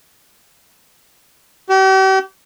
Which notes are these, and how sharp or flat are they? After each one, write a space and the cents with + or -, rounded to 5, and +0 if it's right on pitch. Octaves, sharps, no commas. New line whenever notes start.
G4 -40